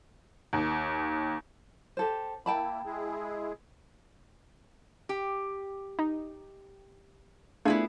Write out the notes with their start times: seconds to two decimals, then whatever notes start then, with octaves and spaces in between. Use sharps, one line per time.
0.53 D#2
1.97 G4 A4 C5
2.46 A#3 E4 G5 A5 B5
2.85 G#3 E4 G#4
5.09 G4
5.99 D#4
7.65 A3 B3 D4 E4 F4 G#4